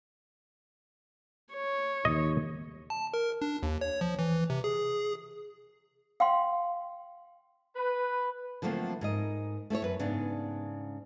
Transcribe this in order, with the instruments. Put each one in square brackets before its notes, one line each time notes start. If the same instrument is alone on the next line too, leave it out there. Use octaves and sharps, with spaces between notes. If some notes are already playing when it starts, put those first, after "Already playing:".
[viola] C#5
[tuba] D#2 [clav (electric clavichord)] D#5
[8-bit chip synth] A5
A#4
D4
D#2
C#5
F3
E3
C3
G#4
[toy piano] F5 G5 C6
[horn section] B4
[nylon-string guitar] D3 F3 F#3 A3 A#3 C4
G#2 A#4 D#5
A3 E4 C5 C#5
F#2 B4
G#2 C#3 B3 D4